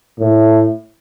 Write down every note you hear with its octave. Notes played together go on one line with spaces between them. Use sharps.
A2